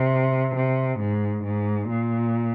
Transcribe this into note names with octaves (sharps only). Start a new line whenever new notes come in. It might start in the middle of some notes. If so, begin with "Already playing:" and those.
Already playing: C3
C3
G#2
G#2
A#2